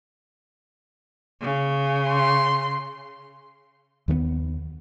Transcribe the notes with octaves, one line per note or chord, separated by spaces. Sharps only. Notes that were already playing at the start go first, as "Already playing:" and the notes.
C#3
C6
D#2 D#3 G#3 B3